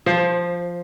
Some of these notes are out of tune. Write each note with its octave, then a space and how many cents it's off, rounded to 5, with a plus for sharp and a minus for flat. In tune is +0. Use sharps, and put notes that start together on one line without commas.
F3 +0 C5 +25